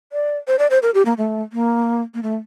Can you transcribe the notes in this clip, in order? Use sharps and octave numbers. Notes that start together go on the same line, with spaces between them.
D5
C5
D5
C5
A#4
G4
A#3
A3
A#3
A#3
A3